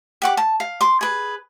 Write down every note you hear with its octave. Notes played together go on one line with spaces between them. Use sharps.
G4 F#5 D6
A5
F5
C6 D6
G#4 B4